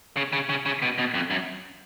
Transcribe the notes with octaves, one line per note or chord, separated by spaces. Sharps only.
C#3
C#3
C#3
C#3
B2
B2
F2
F#2